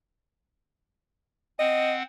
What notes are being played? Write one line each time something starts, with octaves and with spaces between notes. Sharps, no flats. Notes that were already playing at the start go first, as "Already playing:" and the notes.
C4 D#5 F#5